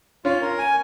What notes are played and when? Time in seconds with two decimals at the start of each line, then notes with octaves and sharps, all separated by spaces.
0.25 C#4 F4
0.42 A#4
0.59 G#5